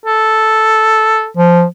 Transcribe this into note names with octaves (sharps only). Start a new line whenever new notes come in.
A4
F3